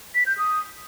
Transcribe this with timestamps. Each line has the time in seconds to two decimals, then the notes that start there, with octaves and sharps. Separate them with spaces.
0.15 B6
0.26 G6
0.38 D#6